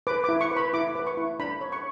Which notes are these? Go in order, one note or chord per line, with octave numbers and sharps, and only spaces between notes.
B4 D6
D6
E4
C#6
B4
B5
E4 D6
B4
C#6
E4
D4 B5
C#5
C#6